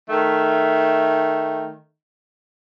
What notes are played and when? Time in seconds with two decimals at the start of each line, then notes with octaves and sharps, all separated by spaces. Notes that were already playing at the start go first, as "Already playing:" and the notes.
0.09 D#3 A3